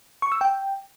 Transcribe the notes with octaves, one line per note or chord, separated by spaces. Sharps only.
C#6
E6
G5